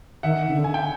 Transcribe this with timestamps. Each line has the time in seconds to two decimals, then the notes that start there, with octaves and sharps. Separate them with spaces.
0.23 D#3 E5 F#5
0.47 C#3
0.54 D3
0.64 G#5
0.74 G5